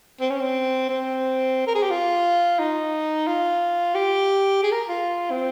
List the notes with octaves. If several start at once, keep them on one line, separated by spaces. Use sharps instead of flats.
C4
C#4
C4
C4
A#4
G#4
G4
F4
D#4
F4
G4
G#4
A#4
F4
C4